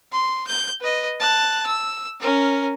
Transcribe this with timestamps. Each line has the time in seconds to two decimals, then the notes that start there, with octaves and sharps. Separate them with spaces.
0.12 C6
0.47 G6
0.81 B4 D#5
1.20 A5 F#6
1.66 E6
2.20 C#4 A#4